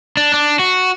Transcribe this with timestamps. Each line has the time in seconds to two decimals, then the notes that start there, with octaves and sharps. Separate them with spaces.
0.17 D4
0.34 D4
0.59 F#4